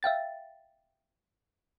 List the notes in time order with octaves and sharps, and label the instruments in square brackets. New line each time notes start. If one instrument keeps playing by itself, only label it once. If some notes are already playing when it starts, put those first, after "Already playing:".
[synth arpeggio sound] E5 F5 G5 A6